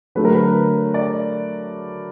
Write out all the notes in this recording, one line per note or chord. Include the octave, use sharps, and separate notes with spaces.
D3 F#3 A3 B4
A#4
B4
D5